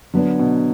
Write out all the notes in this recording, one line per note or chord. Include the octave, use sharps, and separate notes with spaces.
D3 F#3 B3 D4
B2